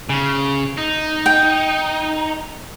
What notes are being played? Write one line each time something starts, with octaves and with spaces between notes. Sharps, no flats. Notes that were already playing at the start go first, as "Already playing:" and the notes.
C#3
D#4
G5